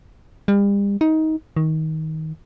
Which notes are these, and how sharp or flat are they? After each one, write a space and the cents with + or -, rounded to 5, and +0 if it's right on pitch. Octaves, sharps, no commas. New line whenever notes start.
G3 +40
D#4 +20
D#3 +20